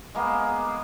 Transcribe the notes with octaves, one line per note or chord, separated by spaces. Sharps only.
G#3 A#3 B3